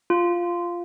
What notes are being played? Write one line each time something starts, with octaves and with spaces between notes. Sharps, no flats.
F4